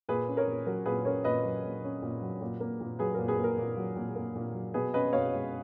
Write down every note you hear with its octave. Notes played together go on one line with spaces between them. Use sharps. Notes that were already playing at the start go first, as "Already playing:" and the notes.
A#2 G#4 B4
C#4
A#4 C#5
A#2
F#3 A#4
A#2 G#4 B4
C#4 A#4 C#5
A#2 B4 D#5
F#3
A#2
C#4
A#2
F#3
A#2
A#3
A#2
F#3 G#4 B4
A#2 A#4
G#4 B4
A#3
A#4
A#2
F#3
A#2
A#3
A#2
F#3
B2 G#4 B4
C#4 B4 D#5
B2 C#5 F5
G#3